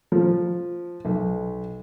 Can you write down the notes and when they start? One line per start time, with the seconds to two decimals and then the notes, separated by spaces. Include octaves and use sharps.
0.12 F3
1.05 B1